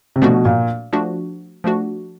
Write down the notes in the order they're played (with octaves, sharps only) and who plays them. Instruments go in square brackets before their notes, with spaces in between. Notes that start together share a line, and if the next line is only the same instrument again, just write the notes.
[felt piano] C3
[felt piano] B2 [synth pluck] F3 A3 D4 F#4
[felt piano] A#2
[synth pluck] F3 A3 D4 F#4
F3 A3 D4 F#4